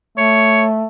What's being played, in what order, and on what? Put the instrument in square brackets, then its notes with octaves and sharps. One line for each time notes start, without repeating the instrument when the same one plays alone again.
[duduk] A3 [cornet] C#5